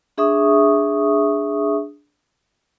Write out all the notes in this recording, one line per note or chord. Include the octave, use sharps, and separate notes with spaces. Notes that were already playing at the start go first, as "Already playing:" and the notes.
D4 G#4 E5 C#6 D#6